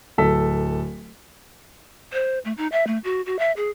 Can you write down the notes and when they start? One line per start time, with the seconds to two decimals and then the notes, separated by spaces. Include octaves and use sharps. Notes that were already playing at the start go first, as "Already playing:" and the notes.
0.18 D1 A4 B6
2.13 C5
2.45 A3
2.58 D#4
2.72 E5
2.87 A3
3.04 F#4
3.26 F#4
3.39 E5
3.57 G#4